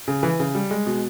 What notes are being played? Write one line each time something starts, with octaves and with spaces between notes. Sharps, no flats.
C#3
E3
C#3
G3
G#3
B2